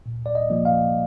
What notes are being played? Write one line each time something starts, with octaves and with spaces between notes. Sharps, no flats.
A#2
D5
D#5
F3 A#3
F5